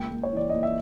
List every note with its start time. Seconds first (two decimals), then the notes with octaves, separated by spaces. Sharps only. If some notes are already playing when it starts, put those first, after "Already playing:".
Already playing: C#2 A#3 G5
0.11 A#3
0.23 C#5
0.33 E3 D5
0.49 A#3 D#5
0.63 E5